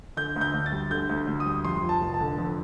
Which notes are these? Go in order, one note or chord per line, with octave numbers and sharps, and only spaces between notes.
D3 G6
D2
G6
D2
A6
G3
D3 G6
D2
D2
D#6
G3
F2 C6
F3
A5
F1
A5
D3
F2